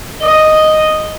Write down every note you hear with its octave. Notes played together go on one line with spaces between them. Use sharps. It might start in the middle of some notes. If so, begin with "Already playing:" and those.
D#5